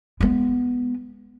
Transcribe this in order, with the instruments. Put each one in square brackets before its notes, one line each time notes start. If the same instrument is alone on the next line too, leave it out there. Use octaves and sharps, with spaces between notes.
[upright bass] G#3 B3